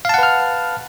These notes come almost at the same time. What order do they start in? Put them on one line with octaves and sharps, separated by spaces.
F5 A5 F#5 B4 F6